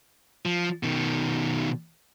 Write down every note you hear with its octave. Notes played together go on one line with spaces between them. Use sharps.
F3
B2 D#3